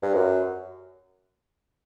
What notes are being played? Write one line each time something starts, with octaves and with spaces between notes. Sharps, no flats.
G2
F#2